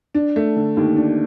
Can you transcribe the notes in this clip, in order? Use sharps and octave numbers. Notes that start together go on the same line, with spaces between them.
D4
A3
D3
D#2
D4